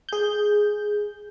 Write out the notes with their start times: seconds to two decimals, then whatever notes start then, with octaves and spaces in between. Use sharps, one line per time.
0.09 G#4 G6